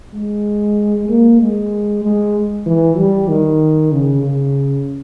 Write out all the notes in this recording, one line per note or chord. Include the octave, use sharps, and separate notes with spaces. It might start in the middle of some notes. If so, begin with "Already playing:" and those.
G#3
A#3
G#3
G#3
E3
G3
D#3
C#3
C#3